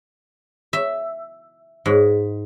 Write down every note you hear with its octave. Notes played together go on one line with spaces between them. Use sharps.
E5
G#2